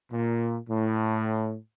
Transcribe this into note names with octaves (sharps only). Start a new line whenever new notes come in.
A#2
A2